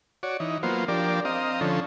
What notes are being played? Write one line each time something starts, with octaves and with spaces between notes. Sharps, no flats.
F#4 C#5 D5
E3 D#4
F#3 A#3 B3 F4 C5
F3 D4 G4 A#4 D5
C4 D#5 F5 A#5
D3 F3 C#4 A4